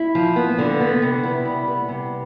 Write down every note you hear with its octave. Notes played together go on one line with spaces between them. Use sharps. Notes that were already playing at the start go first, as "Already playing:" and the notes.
Already playing: E4
F3
B3
D3
B3
C3
E4
G3
B3
C3